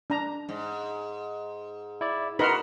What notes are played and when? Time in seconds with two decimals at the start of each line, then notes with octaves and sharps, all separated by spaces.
0.10 D4 A#5
0.49 G#2
2.01 E4 D5
2.39 D#4 F#4 A#4 B4 B5 C6 F6